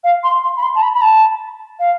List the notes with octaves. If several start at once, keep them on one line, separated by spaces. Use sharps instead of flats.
F5
C6
C6
B5
C6
A5
B5
B5
A5
F5